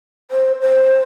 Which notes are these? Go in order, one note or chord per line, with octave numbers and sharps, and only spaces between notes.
C5
C5